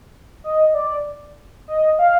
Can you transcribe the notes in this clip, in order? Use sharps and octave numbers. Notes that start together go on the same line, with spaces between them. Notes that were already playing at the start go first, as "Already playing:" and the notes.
D#5
D5
D#5
F5